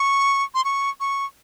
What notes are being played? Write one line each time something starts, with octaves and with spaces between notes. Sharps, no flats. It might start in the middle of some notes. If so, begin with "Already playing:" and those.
Already playing: C#6
C6
C#6
C#6